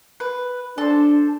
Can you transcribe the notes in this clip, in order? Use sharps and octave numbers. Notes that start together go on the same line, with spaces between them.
B4
D4 A4 C5